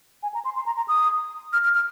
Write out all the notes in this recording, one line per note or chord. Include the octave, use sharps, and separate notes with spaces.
G#5
A#5
C6
C6
A#5
A#5
D#6
F6
F6
F6